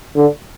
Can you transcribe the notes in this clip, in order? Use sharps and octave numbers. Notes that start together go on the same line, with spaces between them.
D3